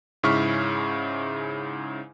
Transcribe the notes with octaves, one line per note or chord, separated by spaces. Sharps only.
G#2 C#3 E4 C#6 F6 B6